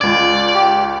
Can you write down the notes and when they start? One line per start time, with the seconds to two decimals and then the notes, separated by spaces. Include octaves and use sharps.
0.01 C#2 D5 G#6
0.54 G4